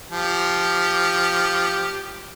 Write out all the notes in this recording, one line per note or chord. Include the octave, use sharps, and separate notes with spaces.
F3 G4